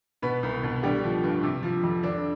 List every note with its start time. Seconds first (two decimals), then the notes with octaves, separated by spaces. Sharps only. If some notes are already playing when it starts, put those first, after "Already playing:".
0.22 B2 B3 B4
0.43 C2
0.63 B2
0.83 D3 G3 G4
1.04 F3
1.23 G2
1.43 C3
1.63 F3
1.83 F2
2.03 D3 D4